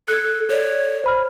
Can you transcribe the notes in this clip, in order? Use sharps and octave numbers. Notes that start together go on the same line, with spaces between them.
A4 F#6 G#6
A4 C#5 D5
C5 B5 F6